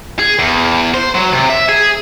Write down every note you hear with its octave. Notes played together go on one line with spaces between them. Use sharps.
G#4
E2
C5
F#3
C3
E5
G#4